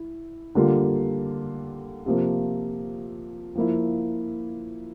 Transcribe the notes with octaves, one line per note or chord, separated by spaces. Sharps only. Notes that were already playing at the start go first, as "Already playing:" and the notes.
Already playing: E4
D3 G3 A#3 F4
C3 F3 A#3
F3 A#3 E4